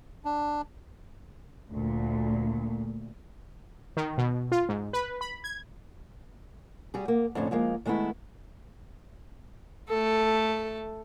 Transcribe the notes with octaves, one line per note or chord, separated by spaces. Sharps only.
D4
D2 A#2
D#3
B2
F4
G#2
B4
B5
G#6
G3 F#4 G#4
A#3
F2 A2 D3 C#4
F3 G#3 A#3
D#3 G#3 A3 B3 E4
A3 A4